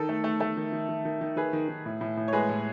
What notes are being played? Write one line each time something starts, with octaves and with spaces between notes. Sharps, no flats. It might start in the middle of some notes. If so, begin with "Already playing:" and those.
Already playing: D#3 A4
A3
A3
A3 A4
D#3
D#3
D#3
D#3
D#3
D#3 G#4 B4
D#3
D#3
A2
A2
A2
C#5
G#3 G#4 B4
A2